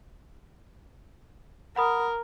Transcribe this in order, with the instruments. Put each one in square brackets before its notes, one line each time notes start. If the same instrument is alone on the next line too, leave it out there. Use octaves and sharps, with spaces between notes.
[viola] A#4 [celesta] F#5 B5 D#6